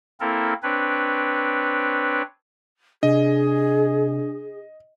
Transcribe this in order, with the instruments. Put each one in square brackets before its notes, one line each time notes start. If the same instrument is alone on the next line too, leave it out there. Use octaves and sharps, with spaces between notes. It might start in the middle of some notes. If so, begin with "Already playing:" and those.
[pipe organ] A#3 C4 E4 A4 A#4
C4 D4 B4 C#5
[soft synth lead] C3 [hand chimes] D4 [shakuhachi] G#4 [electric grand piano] D#5